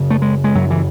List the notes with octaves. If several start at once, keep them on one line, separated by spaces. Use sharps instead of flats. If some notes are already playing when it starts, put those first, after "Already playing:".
Already playing: F#2 C#3
A3
G#3
G#3
F#2 C#3 F#3
E3